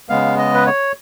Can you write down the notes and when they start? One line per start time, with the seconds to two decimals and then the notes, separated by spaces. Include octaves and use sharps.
0.09 C#3 G#3 B3 F5
0.38 D#5
0.54 B4
0.67 C#5